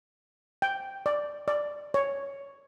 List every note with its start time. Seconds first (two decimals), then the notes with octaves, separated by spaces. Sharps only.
0.62 G5
1.06 D5
1.48 D5
1.94 C#5